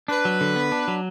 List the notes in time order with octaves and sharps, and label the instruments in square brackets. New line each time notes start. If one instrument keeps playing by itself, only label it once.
[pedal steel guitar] D4 [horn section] B4
[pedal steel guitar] F#3
D3
B3
D4
F#3